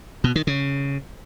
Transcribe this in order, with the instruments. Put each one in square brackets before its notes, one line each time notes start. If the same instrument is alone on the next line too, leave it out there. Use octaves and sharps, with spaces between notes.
[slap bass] B2
D#3
C#3